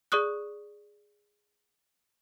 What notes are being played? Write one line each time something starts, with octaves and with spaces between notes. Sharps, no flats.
G#4 D5 C#6 D#6 F#6